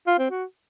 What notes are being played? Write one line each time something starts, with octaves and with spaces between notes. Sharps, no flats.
F4
C4
F#4